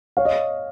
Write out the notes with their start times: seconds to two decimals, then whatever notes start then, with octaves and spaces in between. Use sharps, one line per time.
0.17 C#5 F5
0.25 D#5